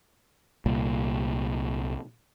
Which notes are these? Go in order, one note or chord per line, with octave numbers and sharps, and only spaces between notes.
C2 A#2